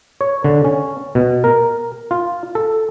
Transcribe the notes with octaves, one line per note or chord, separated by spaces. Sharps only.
C#5
D3
C#4
B2
A#4
F4
A4